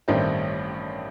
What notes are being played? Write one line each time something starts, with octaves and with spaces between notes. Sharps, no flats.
A1 G2 D#3 A3 C4